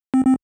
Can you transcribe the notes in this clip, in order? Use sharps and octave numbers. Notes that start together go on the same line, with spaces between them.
C4
C4